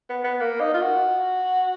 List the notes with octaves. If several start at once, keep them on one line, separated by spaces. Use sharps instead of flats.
B3
B3
A#3
D#4
F4
F#4